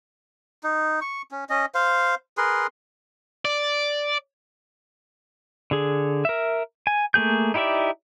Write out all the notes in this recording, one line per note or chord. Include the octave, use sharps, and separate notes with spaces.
D#4
C#6
C#4
C#4 D#5
C5 F5
G#4 A#4 B4 C6
D5
D3 G#4
A#4 E5
G#5
A3 A#3 G#4 G6
D#4 E4 G4 D5 E5